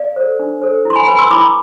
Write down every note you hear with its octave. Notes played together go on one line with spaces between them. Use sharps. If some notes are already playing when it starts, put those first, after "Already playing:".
Already playing: D5 F5
A4 C5
D4
A4 C5
E4 C6
G#5 B5
B4 G#5 B5
C6 E6
E4 B5 D6